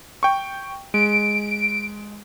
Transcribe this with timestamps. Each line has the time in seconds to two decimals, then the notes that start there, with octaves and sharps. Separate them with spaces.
0.23 G5 C#6
0.94 G#3 D7